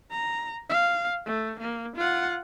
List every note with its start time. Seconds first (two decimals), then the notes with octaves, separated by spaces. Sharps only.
0.11 A#5
0.69 F5
1.25 A3
1.60 A#3
1.96 F4 F#5